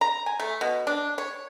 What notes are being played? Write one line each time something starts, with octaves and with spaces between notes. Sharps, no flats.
A#5
G#5
A3
B2
D4
C#5